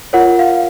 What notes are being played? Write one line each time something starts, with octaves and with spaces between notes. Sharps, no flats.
F4 A#4 C#5 F#5
F5